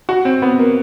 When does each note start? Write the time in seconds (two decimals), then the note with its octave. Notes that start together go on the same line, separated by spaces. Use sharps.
0.09 F#4
0.25 C4
0.42 B3
0.59 A#3